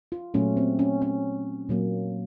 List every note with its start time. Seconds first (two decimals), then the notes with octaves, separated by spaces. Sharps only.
0.12 F4
0.34 A#2 F#3 A3 C#4
0.57 C4
0.79 C#4
1.02 C#4
1.69 A#2 F#3 A#3